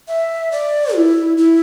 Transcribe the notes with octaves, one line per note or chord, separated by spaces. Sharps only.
E5
D5
E4
E4